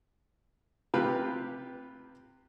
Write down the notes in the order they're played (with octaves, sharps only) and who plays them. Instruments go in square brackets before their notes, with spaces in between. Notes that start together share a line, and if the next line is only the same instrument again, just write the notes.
[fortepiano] C3 F4 G4 B4